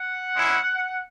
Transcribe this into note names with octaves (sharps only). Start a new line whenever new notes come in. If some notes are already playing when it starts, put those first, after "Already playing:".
Already playing: F#5
G#3 C#4 E4